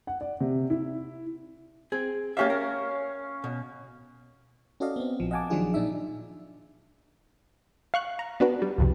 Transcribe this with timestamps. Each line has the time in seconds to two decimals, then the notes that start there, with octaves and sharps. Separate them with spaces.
0.07 F#5
0.21 D5
0.40 C3
0.70 E4
1.92 C4 G#4
2.37 A#3 C#4 G4 E5 F5
2.50 A#4
3.44 B2
4.80 C#4 F#4 A4 D5 D#5 F5
4.96 B3 C4
5.20 A#1 F3
5.31 D#5 F5 F#5 G#5 A5 D6
5.50 D#3 F3 F#3 D4 F4 G#4
5.74 A#2 D4 D#4 E5
7.94 F5 C#6 F#6
8.19 A#5
8.40 B3 D4 F#4 B4
8.62 G3
8.78 C2 F2 C3